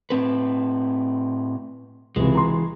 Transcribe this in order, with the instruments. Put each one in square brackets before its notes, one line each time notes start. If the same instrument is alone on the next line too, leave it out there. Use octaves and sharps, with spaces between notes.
[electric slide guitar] A2 C4 B4
[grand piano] C#2 C3 [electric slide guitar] E3 G#3
[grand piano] A#5 C6